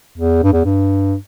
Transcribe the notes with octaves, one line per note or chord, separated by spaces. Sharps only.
E2
G2
E2
G2